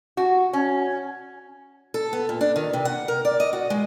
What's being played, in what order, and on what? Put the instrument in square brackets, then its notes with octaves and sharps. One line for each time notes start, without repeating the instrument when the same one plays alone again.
[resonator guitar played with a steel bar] F#4
C#4
[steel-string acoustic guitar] A4
B3
A#2
D4
D#3
C3
F#5
A#4
D5
D#5
F#4
G#3